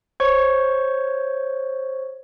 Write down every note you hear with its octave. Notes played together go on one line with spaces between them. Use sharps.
C5 C#5 C#6